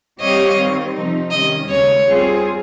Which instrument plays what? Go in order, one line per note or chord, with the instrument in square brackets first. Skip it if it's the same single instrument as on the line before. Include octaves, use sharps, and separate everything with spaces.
[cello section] G3 C4 G4 C#5 F5 [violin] D#5
[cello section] D#3 G3 C4
C3 F3 C4 D#4
[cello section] C3 D#3 G3 C#4 [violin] D#5
[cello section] D#2 C#3 G#3 [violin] C#5
[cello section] G3 C4 F4 G#4